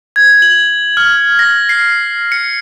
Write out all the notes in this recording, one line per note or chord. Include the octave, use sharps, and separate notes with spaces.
G#6
F#7
F6
A#6
C7
C#7